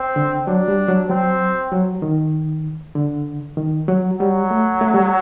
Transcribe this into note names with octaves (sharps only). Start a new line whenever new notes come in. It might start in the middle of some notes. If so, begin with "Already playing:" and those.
Already playing: C4
D3
F#3 D4
G3
F#3
F#3 C4
F#3
D#3
D3
D#3
F#3
F#3 G3
A3
A3
G3